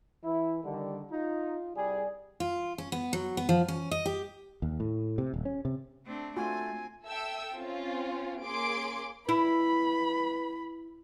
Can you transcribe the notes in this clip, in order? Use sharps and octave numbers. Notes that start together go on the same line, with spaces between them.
E3 E4
D3 D#3 G3
D#4 F4
C2 G3 G#4 D5
F4
C#4
B3
F#3
B3
F3
C#4
D#5
G4
D#2
A2
C3
D#1
C#4
C3
A3 C4 D4
A3 C4 F4 F#4 G#5
A4 E5 G5 E6
C4 C#4 F4
A#3 C#4 G#4 C6 D6 D7
E4 B4 B5